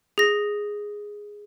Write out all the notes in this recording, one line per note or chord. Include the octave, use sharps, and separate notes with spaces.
G#4 A#6